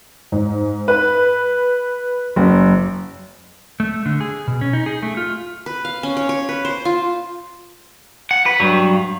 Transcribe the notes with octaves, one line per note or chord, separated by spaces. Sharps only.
G#2
B4
F#1
A3
D3
G#4
B2
C#4
D#4
G#4
A3
F4
B4
F5
C#4
C#5
C#5
B4
C5
F4
F#5
B4
G2 F#3